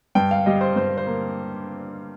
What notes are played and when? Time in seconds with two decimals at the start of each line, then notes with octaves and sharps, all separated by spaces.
0.15 G2 G5
0.31 F5
0.46 G3 D#5
0.61 C5
0.76 G2 C5
0.98 C5
1.07 A#3